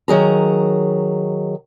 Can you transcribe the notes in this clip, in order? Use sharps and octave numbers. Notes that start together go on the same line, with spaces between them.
D#3 F#3 G#4 A#5